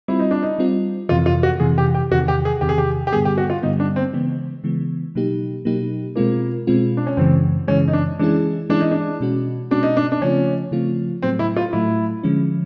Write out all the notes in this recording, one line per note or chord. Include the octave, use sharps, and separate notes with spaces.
G3 C4 E4 F4
D#4
D4
D#4
G3 C4 F4
F2 C3 E3 F4
F4
F#4
F2 C3 E3 G#4
G4
G4
E2 C3 D#3 F#4
G4
G#4
E2 C3 D#3 G4
G#4
G4
G4
G2 D3 G3 B3 G#4
G4
F#4
F4
G2 D3 G3 B3 D#4
D4
C4
C#3 E3 G#3 B3
C#3 E3 G#3 B3
B2 F#3 A#3 D#4 G4
B2 F#3 A#3 D#4 G4
B2 G#3 A#3 C4 F4
B2 G#3 C4 F4
D4
C#4
F#2 C#3 E3 G#3 C4
F#2 C#3 E3 G#3 C#4
D#4
D4
E3 G#3 C#4 D4 E4 G#4
E3 G#3 C#4 D4 E4 G#4
D#4
D4
B2 G#3 C#4 F#4
B2 G#3 C#4 D4 F#4
D#4
D4
D4
C#3 F3 A3 C4 C#4 F4
C#3 F3 A3 C4 F4
A2 F#3 A3 C4
E4
F4
A2 F#3 A3 E4
D3 F3 G#3 C#4